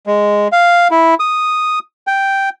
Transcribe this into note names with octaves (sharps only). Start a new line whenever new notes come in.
G#3
F5
E4
D#6
G5